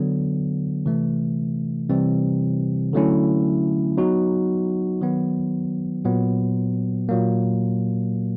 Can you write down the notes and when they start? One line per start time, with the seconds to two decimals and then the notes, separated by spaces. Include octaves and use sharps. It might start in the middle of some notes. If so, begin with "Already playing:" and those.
Already playing: D3 F#3 B3
0.86 C3 E3 A3
1.89 C3 E3 G3 C4
2.93 D3 F#3 A3 C#4 E4
3.97 F#3 B3 D#4 F#4
5.01 D#3 F#3 B3
6.05 A#2 F#3 B3
7.09 A#2 F#3 A#3